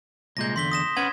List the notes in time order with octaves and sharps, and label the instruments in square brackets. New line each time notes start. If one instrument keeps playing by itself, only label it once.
[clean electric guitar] C2 A#2 G#3 [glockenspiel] G6 A#6
[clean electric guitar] E2 D3 [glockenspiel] C6 B6 G7
[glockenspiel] D#6 A#6 E7
[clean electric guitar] C#4 B4 F#5 [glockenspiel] G#6